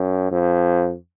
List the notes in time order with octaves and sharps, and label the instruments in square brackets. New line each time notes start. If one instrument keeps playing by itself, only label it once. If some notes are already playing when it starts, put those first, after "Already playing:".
Already playing: [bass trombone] F#2
F2